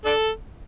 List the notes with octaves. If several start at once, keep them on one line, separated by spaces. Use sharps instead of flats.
D4 A4